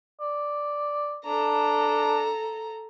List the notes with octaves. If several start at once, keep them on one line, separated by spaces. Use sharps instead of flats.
D5
D4 A4 A#5